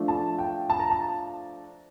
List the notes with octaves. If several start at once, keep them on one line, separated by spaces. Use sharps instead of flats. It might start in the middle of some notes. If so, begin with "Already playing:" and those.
Already playing: F3 A3 D4
A5
G5
A5
A#5
A5